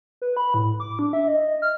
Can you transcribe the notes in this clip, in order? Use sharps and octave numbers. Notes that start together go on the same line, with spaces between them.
B4
B5
A2
D6
D4
E5
D#5
F6